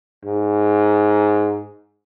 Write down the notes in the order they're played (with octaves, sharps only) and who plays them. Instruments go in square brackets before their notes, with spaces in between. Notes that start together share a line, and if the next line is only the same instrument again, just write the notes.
[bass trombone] G#2